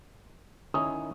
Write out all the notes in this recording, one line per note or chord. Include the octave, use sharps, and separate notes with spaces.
D#3 C#4 E4 D#6